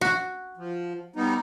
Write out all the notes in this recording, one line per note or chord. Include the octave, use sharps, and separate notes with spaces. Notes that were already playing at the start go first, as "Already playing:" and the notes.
F#4
F3
G3 B3 D#4